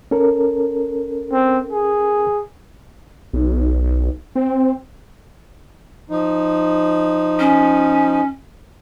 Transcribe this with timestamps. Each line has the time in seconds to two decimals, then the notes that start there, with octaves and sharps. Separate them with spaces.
0.11 C#4 A4 A#4
1.32 C4
1.72 G#4
3.33 B1
4.35 C4
6.09 F3 D#4
7.39 C#4